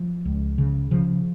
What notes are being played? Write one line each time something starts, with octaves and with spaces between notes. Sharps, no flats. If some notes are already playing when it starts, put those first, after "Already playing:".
Already playing: F3
C#2
C#3
C#3 F3